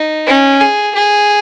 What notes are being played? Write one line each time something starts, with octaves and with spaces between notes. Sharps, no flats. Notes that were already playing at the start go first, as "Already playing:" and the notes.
Already playing: D#4
C#4
G#4
G#4